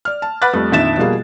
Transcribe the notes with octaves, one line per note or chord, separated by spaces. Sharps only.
D5 F6
A5
B4 F#5 B5 D6 F#6 A6
F2 G3 A3
A#1 F2 D#3 E5 A6 E7
B2 F3 G3 A#3 F4 G#4